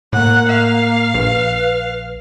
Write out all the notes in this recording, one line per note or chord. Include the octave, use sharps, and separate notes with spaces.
A2 A#3 F#5
F5
A#1 B4